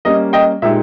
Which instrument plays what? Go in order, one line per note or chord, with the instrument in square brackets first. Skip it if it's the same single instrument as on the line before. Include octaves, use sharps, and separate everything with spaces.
[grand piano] G3 A#3 C#4 [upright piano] D#5
[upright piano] D#5 G5
[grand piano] A#2 G#3 D#4 G4 [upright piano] E5